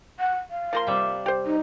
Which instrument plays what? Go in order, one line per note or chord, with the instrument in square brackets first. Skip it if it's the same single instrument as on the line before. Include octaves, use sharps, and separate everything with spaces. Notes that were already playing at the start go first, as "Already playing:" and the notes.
[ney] F#5
F5
[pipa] F3 A#3 C6
[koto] C3 G3 E5
[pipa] G4 C5
[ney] D#4